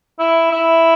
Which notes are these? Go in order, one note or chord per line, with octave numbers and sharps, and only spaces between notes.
E4
E4